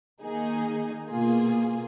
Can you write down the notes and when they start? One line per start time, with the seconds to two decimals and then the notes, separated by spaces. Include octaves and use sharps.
0.22 D#3 A#3 D#4 G#4
1.09 B2 A#3 F4 G#4